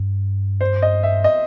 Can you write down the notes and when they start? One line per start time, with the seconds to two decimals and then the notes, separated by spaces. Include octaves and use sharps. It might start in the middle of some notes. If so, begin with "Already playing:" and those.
Already playing: G2
0.61 C5
0.82 D#5
1.03 E5
1.24 D#5